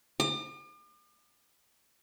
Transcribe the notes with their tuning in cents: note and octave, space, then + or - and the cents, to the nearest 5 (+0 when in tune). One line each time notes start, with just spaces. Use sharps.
D6 +45